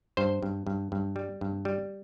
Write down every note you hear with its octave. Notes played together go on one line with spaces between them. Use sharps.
G2 C5
G2
G2
G2
G3
G2
G3